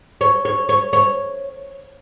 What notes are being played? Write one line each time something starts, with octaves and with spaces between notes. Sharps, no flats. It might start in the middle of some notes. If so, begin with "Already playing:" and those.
C#5
C#5
C#5
C#5